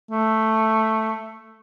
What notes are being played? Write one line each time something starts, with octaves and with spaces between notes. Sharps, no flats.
A3